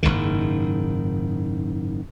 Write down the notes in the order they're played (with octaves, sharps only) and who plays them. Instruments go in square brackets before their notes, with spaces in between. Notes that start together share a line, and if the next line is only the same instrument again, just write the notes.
[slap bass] F#1 C2 G#2 D#3